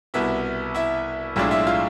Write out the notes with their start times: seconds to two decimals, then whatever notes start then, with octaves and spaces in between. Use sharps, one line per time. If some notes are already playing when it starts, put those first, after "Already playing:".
0.14 C2 B2 B3 E4 E5
0.74 E4 E5
1.36 B1 A2 G#3 D4 E4 F4 E5
1.51 E4 E5
1.67 F4 F5